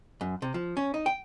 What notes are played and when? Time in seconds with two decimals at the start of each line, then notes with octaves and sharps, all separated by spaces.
0.21 F#2
0.42 C3
0.54 F3
0.77 C#4
0.94 D#4
1.06 G5